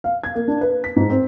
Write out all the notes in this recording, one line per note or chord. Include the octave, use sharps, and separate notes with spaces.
F5
G#6
A#3
D4
B4
B6
G#2
C4